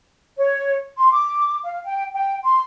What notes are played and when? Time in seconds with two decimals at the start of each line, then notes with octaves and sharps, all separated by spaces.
0.38 C#5
0.97 C6
1.11 D6
1.63 F5
1.84 G5
2.13 G5
2.43 C6